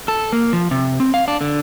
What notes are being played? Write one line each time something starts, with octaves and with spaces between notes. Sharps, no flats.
A4
A#3
F3
C3
C4
F5
D4
D3